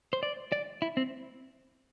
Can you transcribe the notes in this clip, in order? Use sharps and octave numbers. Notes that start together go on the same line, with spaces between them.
C5
D5
D5
E4
C4